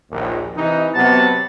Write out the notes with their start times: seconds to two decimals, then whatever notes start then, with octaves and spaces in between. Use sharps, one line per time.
0.11 A#1 D#2
0.55 C3 E3 D#4
0.95 C3 F#3 B3 A5